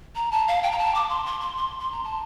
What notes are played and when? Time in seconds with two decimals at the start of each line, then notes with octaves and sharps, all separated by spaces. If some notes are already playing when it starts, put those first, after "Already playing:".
0.15 A#5
0.32 A5
0.48 F5
0.63 G5
0.72 A#5
0.78 A5
0.95 D6
1.09 C6
1.26 C6
1.41 C6
1.57 C6
1.80 C6
1.92 A#5
2.04 A5